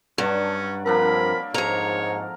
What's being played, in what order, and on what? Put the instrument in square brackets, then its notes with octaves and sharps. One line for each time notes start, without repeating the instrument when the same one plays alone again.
[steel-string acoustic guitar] G2 [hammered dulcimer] F#3 D4 [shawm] C#4
[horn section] F3 C4 A#4 [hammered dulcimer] A#3 D4 A4 [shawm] B5
[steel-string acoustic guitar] F2 A#5 [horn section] G#2 [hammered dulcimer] A#4 [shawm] C#5